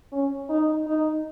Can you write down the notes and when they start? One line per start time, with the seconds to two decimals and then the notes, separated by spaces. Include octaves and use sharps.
0.12 C#4
0.50 D#4
0.87 D#4